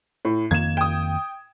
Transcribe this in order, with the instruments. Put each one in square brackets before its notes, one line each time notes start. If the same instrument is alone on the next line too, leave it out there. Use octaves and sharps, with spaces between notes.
[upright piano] A2
[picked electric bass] F2 D#3 A#3 [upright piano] G#6 E7
[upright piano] G5 D#6